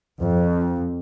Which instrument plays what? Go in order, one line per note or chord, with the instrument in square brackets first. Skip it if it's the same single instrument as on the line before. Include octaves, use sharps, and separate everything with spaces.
[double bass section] F2